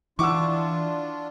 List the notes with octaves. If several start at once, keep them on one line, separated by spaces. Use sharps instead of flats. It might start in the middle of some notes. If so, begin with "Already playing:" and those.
E3 D4 E4 F4 F#5 C#6 D6 E6